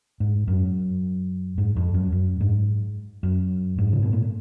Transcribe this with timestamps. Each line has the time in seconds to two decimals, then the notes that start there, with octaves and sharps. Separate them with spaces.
0.20 G#2
0.48 F#2
1.58 G#2
1.76 F2
1.94 F#2
2.12 F#2
2.40 G#2
3.23 F#2
3.78 G#2
3.93 C#3
4.02 B2
4.13 A#2